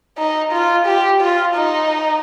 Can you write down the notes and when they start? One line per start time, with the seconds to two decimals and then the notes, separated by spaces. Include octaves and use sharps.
0.18 D#4
0.52 F4
0.86 G4
1.21 F4
1.55 D#4